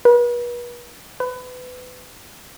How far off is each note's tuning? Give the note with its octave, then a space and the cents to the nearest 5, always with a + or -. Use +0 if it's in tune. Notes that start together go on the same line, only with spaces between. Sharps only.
B4 -40
B4 +25